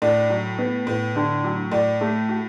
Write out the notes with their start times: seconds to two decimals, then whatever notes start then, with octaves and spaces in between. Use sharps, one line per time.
0.02 A2 D4
0.30 F#3
0.59 B3
0.87 A2 B3
1.16 D3
1.44 F#3
1.72 A2 D5
2.01 A3
2.29 F#4